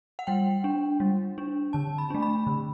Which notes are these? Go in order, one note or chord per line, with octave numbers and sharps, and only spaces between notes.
F#5
G3 G5
D4
G3
D4
D3 A5
B5
A3 D4
B5
D3